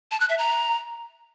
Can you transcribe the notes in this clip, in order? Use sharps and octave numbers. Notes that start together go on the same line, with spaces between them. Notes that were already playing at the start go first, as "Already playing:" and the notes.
A5
F#6
E5
A#5